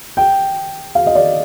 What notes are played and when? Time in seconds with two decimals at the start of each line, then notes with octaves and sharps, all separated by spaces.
0.17 G5
0.95 F5
1.07 D#5
1.15 D5